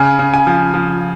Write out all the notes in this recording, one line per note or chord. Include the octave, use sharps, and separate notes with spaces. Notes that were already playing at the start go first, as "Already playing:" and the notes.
Already playing: C#3 G#5
C#3
G#5
F3
F3